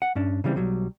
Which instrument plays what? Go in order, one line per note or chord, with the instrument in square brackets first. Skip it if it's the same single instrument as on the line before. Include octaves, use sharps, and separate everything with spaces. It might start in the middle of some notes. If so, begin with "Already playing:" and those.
[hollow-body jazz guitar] F#5
G2 C#4 D4
C#3 E3 G3 C4
B1 F#3 G3